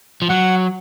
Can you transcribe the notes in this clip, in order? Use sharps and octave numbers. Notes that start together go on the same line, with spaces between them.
F3
F#3 F#5